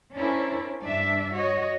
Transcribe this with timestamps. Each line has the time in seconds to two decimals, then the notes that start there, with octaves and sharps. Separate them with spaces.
0.15 C#4 D4 E4 A#4 C5
0.83 G2 D4 E5
1.33 F#4 C#5 D#5